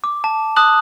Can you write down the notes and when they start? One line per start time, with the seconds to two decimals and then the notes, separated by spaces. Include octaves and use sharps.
0.04 D6
0.24 A5
0.56 A5 D#6 F#6 F#7